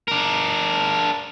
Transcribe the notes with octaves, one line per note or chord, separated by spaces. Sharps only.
D4 A#4